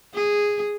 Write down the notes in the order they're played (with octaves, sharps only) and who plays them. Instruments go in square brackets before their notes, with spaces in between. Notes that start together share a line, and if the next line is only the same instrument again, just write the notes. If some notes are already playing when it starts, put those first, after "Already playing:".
[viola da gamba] G#4